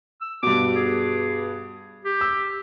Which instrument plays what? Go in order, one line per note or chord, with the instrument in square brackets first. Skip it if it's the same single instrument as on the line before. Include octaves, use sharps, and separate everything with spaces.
[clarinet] E6
[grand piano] G2 B2 [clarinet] D6
[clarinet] G#4
G4
[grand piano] E6